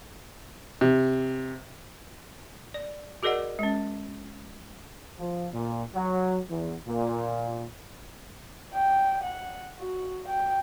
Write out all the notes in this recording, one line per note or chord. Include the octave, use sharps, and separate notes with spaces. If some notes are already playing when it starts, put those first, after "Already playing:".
C3
D5
F#4 G#4 A#4 D5 D#5 F#5
G#3 C#4
F3
A#2
F#3
E2
A#2
G5
F#5
F#4
G5